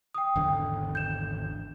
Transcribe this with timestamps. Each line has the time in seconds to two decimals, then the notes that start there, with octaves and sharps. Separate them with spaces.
0.15 G5 D#6
0.36 G#1 E2 D3 G5
0.95 G6 E7